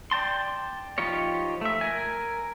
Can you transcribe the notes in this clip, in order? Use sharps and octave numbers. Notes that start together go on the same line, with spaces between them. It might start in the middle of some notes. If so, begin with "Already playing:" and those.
D5 G5 A5 C6
F3 D#4 F4 G4 C#5
A3 E5
A#4 G#5